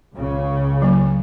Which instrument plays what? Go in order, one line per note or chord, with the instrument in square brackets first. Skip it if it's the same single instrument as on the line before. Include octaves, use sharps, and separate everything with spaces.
[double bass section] C#2 C#3
[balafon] F#3 A#3